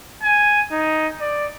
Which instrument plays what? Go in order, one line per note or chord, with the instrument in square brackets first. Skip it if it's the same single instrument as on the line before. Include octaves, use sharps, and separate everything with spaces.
[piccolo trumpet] G#5
D#4
D5